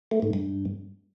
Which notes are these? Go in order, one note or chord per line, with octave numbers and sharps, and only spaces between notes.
A3
G#2
G2